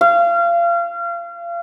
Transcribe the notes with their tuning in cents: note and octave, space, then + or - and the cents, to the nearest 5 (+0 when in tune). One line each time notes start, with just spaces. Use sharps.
F5 -30